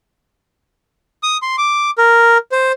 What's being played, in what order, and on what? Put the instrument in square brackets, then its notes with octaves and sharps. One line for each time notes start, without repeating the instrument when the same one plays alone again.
[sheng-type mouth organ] D#6
C6
D6
A#4
C5